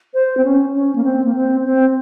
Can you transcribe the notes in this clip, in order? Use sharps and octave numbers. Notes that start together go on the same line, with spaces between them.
C5
C4
C#4
C#4
A#3
C4
A#3
C4
C4